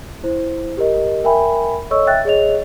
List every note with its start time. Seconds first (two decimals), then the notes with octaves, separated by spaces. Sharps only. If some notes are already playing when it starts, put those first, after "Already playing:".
0.24 E4 C5
0.77 G4 A#4 D#5
1.24 A#4 E5 G5 G#5 B5
1.91 A4 C#5 D#5 C#6 E6
2.07 E5 G5 F#6 A6
2.25 G#4 C#5 D#5 F7